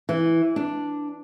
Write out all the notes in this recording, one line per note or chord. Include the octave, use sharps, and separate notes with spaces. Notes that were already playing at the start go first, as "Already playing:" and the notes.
E3
D4